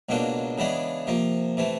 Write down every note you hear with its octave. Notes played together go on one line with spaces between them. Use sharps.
C#2 B2 F#3 A#3 D4
C#3 E3 G#3 B3 D4
C3 F3 A#3
C3 E3 A3